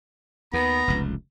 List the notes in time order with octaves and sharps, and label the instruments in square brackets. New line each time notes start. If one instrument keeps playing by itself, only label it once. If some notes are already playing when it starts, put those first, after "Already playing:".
[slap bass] D#2 [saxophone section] B3 [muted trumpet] A#5
[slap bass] F1 C#2